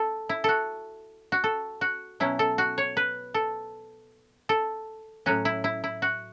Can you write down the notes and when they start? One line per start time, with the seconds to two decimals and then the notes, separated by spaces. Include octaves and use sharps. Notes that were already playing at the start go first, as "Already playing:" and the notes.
Already playing: A4
0.29 E4
0.44 F#4 A4
1.32 F#4
1.44 A4
1.81 F#4
2.20 B2 F#3 C#4 E4
2.39 A4
2.58 F#4
2.78 C#5
2.97 B4
3.34 A4
4.49 A4
5.26 A2 F#3 C#4 F#4
5.45 E4
5.64 E4
5.84 E4
6.02 F#4